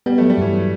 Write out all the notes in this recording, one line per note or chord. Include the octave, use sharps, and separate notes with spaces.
G3 B3
F#3 A3
G3
G2 E3
F#3